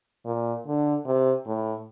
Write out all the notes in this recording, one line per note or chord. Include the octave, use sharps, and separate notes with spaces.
A#2
D3
C3
A2